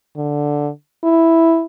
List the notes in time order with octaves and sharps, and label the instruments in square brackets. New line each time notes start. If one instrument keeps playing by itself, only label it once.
[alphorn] D3
E4